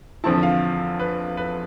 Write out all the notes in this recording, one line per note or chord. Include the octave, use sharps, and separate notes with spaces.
E2 D3 F3 C4 E4 A5
F5
B4
B4